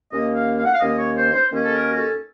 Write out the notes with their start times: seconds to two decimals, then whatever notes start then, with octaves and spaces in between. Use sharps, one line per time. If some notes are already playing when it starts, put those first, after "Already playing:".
0.10 D#2 D#3 A#3 C#4 D#5
0.34 F5
0.56 F5
0.65 F#5
0.73 F5
0.80 D#2 D#3 A#3 C#4 D#5
0.98 C#5
1.16 C5
1.32 C5
1.50 D#2 D#3 A#3 C#4
1.63 A4
1.73 A#4
1.87 F#4
1.97 A4